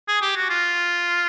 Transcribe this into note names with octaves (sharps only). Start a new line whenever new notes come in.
G#4
G4
F#4
F4